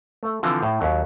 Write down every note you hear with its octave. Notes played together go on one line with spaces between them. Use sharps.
A3
D3 E3 F3 C4
A2
D#2 F#3